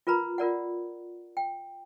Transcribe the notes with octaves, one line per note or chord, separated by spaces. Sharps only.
F4 A#4 B4 A#5 B5
F4 A#4 D5 F#5
G5